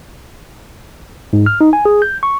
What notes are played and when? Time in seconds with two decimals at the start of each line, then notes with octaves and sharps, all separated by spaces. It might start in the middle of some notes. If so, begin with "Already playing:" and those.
1.33 G#2
1.46 F6
1.61 D#4
1.73 G#5
1.85 G#4
2.02 G6
2.23 C#6